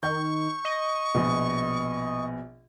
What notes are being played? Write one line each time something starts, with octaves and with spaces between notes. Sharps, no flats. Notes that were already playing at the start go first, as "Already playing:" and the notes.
D#3 C#6 G6
D#5
A#1 B2